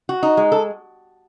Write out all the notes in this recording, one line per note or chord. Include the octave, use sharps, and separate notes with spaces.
F#4
D#4
G#3
A4